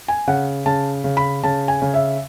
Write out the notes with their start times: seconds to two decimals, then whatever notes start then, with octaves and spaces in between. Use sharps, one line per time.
0.08 G#5
0.27 C#3 F#5
0.66 C#3 A5
1.04 C#3
1.17 B5
1.43 C#3 A5
1.68 G#5
1.82 C#3
1.94 E5